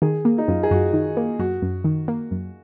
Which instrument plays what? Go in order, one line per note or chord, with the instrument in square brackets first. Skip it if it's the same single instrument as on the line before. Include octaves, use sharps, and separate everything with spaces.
[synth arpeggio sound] D#3 [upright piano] G#4
[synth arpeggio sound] A#3
[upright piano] D#4
[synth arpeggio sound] F#2 [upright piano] F4
[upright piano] G#4
[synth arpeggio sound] F#2 [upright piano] F#4
[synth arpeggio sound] D#3
A#3
[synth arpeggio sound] F#2 [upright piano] F#4
[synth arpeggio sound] F#2
D#3
A#3
F#2